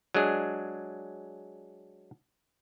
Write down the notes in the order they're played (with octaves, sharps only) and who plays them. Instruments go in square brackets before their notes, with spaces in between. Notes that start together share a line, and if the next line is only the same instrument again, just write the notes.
[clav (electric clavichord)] F#3 G#3 D4 G#4